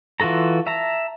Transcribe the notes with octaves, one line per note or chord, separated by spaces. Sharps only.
E3 F4 F#4 A4 A#5
E5 A5 A#5